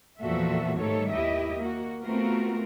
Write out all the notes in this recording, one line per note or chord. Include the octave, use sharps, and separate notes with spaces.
E2 A#2 F3 F#4 A4 E5
G#2 D#3 G3 A3 A4 C#5
D#2 E4 G4 D#5 E5
A#3 F#4
A3 B3 C4 F4 F#4 A#4